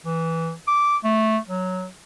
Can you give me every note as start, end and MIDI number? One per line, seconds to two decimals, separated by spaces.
0.05 0.53 52
0.68 0.97 86
1.04 1.38 57
1.48 1.87 54